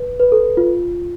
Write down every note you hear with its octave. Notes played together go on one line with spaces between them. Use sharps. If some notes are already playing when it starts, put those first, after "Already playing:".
Already playing: B4
B4
A4
F4